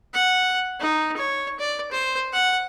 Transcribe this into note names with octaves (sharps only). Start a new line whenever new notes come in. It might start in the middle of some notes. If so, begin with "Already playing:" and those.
F#5
D#4
C#5
D5
C5
F#5